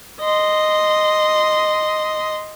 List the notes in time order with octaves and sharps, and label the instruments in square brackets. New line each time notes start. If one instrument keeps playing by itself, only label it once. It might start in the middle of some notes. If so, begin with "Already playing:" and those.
[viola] D#5 C6